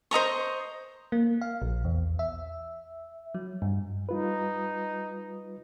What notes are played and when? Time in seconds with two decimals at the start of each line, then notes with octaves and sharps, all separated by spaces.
0.11 C5 D#5 A#5 C#6
1.12 A#3
1.41 F5
1.62 A#1
1.85 E2
2.19 E5
3.34 F#3
3.62 G2
4.09 G3 D#4 F4 B4